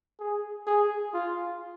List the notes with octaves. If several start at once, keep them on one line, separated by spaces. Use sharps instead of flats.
G#4
G#4
F4